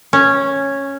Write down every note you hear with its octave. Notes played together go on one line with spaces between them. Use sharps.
C#4